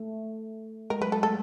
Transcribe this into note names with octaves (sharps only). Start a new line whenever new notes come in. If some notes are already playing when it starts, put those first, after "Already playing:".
Already playing: A3
G#3 A#4
F#3 B4
G#3 A4
A3 A4